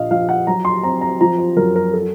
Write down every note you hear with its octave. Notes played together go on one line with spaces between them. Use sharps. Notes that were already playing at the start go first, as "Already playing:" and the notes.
Already playing: A#1 F4 D#5 F5
F3 F5
F#5
F#3 A#5
C6
C4 A#5
A#5
F3 A#5
C5
F#2 A#4
A#4
A4